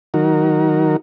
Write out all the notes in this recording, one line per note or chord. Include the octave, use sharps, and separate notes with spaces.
D#3 F#3 D#4 F#4 A#4